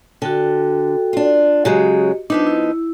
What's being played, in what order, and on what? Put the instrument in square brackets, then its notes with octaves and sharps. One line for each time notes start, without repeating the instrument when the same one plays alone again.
[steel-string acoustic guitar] D3 [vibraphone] F#4 A4 G5
[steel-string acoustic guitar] D4 F4
[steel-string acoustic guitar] C#3 F#3 G#3 [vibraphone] F#4 G4 D#5
[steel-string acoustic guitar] F3 B3 D#4 [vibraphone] D4
[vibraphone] E4